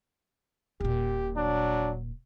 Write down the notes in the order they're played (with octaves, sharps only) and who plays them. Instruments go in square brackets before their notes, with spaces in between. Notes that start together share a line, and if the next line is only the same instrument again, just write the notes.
[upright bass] D#1 A#2 [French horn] G4
[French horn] F#3 [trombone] D4